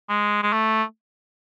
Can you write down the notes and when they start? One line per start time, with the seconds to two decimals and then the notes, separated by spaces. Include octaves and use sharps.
0.09 G#3
0.43 G#3
0.53 A3